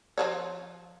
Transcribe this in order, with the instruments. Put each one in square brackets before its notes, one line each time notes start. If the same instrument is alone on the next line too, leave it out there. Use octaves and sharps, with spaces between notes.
[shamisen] F3 C5 C#5